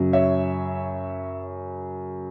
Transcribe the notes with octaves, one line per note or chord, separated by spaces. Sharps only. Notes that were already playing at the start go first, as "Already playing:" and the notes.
Already playing: F#2 C#3 F#3
C#5 E5